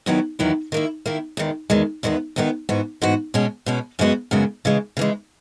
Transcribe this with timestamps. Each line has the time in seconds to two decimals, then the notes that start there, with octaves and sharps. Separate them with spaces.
0.06 E2 D#3 F#3 B3 E4
0.39 E2 D#3 F#3 B3 E4
0.72 D#3 A#3 E4
1.06 D#3 A#3 E4
1.37 E2 D#3 G#3
1.70 E2 D#3 G#3
2.03 E2 D#3 G#3 B3
2.36 E2 D#3 G#3 B3
2.69 G#2 E3 B3 F#4
3.02 G#2 E3 B3 F#4
3.34 B2 G#3 C#4
3.66 B2 G#3 C#4
3.99 F#2 C#3 G#3 B3 F#4
4.31 F#2 C#3 G#3 B3 F#4
4.65 C#3 E3 G#3
4.97 C#3 E3 G#3